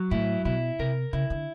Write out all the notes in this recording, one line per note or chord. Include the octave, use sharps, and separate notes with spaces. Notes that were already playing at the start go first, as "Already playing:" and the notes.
Already playing: F#3
A2 E4
B2 E4
C3 A#4
C#3 E4
D3